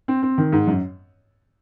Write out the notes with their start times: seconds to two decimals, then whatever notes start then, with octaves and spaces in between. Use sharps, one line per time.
0.08 C4
0.23 C4
0.38 D#3
0.52 G#2
0.67 F#2